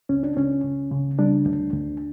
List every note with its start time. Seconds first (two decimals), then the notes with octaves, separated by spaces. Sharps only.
0.09 C#2 C#4
0.23 D4
0.36 C#2 C#4
0.64 C#2
0.91 C#3
1.19 G3 D4
1.46 D2
1.73 D2